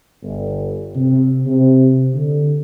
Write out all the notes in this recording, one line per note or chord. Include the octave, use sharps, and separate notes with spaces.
G1
C3
C3
D3